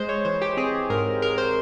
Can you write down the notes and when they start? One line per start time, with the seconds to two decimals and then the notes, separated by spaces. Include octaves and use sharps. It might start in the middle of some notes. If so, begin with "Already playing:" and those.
Already playing: G#3 C5
0.09 C#5
0.25 E3 C5
0.42 G4
0.57 C4 G#4
0.90 G#2 A#4
1.22 G#3 A#4
1.38 C5